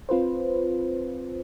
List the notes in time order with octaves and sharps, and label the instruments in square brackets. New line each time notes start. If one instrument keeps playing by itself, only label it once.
[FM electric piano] C4 F4 B4 C5